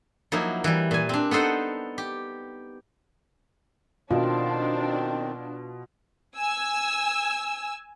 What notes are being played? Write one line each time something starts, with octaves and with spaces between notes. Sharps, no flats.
F3 F#3 A#3 D#4 E4
E3 G3
A#2 G#5
C4 D4
B3 D#4 A4 C5 F#5
G4
B2 D#3 C4 D4 F4
G#5 E6